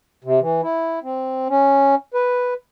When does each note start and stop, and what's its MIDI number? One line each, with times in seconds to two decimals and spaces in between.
0.24 0.40 48
0.41 0.61 52
0.62 0.99 64
1.03 1.48 60
1.49 1.95 61
2.14 2.54 71